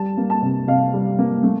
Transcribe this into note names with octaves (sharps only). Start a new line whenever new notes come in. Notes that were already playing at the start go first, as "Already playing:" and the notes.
Already playing: G3 A5
A#3
A5
C3
C3 F5
G3
A#3
A3